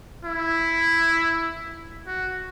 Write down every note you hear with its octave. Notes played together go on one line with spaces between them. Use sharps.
E4
F#4